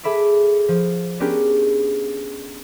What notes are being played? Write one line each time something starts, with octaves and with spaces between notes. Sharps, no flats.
G#4 A4 E5 B5 D6
F3
B3 C#4 D4 G4 G#4 A#4